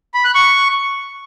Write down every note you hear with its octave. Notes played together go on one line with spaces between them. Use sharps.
B5
F#6
C#6